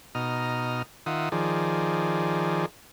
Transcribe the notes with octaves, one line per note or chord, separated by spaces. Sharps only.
B2 D#4 A#5 D#6 F6
D#3 F4 E5 F#5 D#6
D#3 F3 G#4 D5